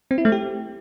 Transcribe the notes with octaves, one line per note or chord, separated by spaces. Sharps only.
C4
E4
A3
G4